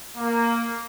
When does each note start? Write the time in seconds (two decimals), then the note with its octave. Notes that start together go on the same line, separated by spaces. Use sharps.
0.17 A#3